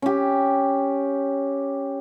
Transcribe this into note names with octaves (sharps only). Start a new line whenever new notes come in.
C#4 G4